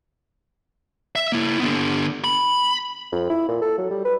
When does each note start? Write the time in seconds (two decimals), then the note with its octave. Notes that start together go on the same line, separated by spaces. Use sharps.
1.16 E5
1.32 A#3 E4
1.59 D3 B3
2.24 B5
3.12 F2
3.30 E4
3.48 A#2
3.62 A4
3.78 F#3
3.91 G3
4.05 B4